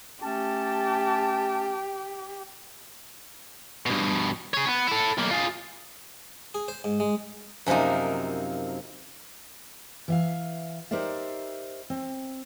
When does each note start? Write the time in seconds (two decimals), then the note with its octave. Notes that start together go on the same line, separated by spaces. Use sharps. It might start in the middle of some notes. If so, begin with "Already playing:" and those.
0.23 A3 C#4 G4 A5
3.86 G2 B2
4.54 G#4 C#5
4.67 B3
4.87 E4 A4
5.18 B1 A#3
5.31 F4 G#4
6.54 G#4
6.68 C5
6.84 G#2
7.00 G#3
7.66 F#2 C3 F3 A#3 D#4
10.08 E3 E5 F5
10.91 D#4 G4 A#4 C5 D5 E5
11.90 C4